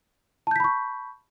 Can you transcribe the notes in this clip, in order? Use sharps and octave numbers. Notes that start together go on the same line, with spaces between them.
A5 B5 C#6 G6 B6